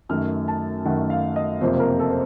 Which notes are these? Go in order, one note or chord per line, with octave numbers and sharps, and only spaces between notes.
F#2 D#3 A3 F6
A5
F#2 D#3 A3 F#5
F5
D#5
F#1 F2 C3 F3 A#3 C5
A#4
A4
C5